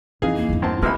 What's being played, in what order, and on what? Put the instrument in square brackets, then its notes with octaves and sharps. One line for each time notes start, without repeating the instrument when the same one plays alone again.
[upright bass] F2 [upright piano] E3 D#4 [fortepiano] G#4 F5
[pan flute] A#3
[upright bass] E2 G2
[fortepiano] F#2 C4 A5
[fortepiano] A1 C3 G#3 [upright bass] F4 [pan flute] B4 [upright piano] B5 E6 F6